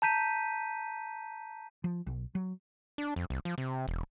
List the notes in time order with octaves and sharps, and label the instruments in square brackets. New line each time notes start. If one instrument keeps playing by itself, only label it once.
[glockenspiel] A5 A#5 G6 B6 D#7
[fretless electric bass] F3
B1
F#3
[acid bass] D4
F2
C2
F3
C3
E1